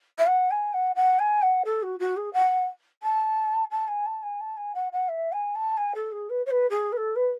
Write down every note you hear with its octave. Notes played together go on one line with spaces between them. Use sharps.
E5
F#5
G#5
F#5
F#5
G#5
F#5
A4
F#4
F#4
G#4
F#5
A5
A5
G#5
A5
G#5
A5
G#5
F#5
F#5
E5
G#5
A5
G#5
A4
G#4
B4
C#5
B4
G#4
B4
A4
B4